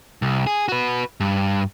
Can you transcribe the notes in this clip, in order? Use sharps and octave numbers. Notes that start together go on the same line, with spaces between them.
C2
G#4
F#4 B4
G2